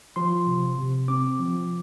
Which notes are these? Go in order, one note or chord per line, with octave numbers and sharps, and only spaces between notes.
F3 C6
C3
C3
C4 D6
F3